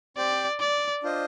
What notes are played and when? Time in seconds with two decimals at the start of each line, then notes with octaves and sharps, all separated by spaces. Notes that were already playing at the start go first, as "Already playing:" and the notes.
0.17 C4 G4 C5 D5 G5
0.60 D5
1.03 D4 F4 C5 D#5